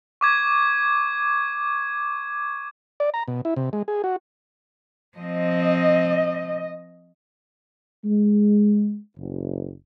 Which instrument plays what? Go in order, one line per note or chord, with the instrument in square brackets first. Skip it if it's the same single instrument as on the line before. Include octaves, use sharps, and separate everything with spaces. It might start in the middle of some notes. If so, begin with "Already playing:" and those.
[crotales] C#6 D6 G#6
[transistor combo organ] D5
A#5
B2
E4
C3
G#3
G#4
F#4
[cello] F3 C4 [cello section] D#5
[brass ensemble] G#3
F#1